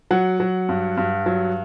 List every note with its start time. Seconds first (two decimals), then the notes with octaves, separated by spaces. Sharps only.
0.11 F#3 F#5
0.40 F#3
0.69 G2
0.97 G2
1.26 F#3